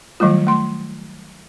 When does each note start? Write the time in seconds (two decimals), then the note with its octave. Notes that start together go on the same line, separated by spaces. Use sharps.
0.20 D#3 F#3 G3 A3 F4
0.47 A3 C6